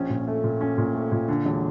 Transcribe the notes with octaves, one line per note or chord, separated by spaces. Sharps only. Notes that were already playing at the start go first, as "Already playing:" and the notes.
Already playing: A#1 C#4
A#2
A3
A#2
C#4
A#2
A3
A#2
D3
E1